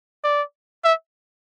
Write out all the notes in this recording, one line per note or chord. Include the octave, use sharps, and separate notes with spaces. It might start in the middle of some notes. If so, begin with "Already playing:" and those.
D5
E5